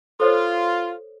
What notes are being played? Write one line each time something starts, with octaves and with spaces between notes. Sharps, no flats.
F4 A4 C5 C#5